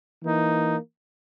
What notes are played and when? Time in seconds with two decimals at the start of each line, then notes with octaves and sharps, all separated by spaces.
0.22 E3 A#3 D#4